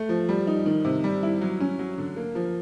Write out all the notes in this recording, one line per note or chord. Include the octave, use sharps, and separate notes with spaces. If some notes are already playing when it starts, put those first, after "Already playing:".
Already playing: A3
F3
G3
D#4
D#3
C3
G3
E4
F#3
C#4
F#3
D3
A#3
F3